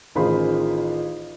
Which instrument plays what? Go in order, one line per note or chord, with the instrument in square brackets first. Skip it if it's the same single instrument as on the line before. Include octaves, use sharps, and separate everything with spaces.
[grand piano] A1 D#3 F4 G#4 C5 B5